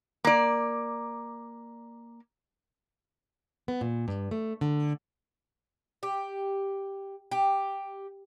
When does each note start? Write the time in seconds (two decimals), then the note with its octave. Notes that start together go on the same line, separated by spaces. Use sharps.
0.25 A#3 D5
3.68 B3
3.81 A#2
4.08 G2
4.31 A3
4.61 D3
6.03 G4
7.31 G4